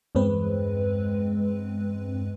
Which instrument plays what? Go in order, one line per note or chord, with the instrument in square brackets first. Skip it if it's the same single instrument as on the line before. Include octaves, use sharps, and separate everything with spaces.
[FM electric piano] E2 G2 G#3 C4 B4